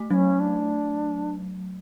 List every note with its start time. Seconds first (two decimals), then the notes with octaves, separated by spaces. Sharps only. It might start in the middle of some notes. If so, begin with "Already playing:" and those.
Already playing: A3
0.10 F#3 C#4 D4
0.40 D4